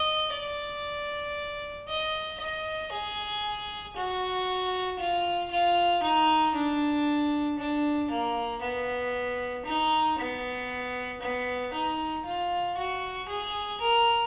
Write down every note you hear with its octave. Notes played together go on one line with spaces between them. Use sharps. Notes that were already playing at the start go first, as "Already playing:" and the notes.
Already playing: D#5
D5
D#5
D#5
G#4
F#4
F4
F4
D#4
D4
D4
A#3
B3
D#4
B3
B3
D#4
F4
F#4
G#4
A#4